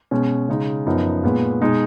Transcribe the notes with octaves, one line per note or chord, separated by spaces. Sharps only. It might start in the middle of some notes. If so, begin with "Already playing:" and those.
B2 G#3 C#4
C#3 G#3 D#4
F#2 F3 B3 D#4
A#2 G#3 B3
B2 G#3 D#4